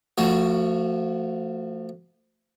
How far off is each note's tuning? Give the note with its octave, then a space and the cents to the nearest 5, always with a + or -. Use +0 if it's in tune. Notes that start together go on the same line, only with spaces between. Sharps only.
F3 -10 A3 +30 F#4 +0